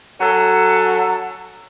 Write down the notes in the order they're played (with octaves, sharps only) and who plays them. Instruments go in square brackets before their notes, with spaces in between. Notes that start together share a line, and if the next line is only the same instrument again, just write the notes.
[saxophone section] F#3 C#4 A4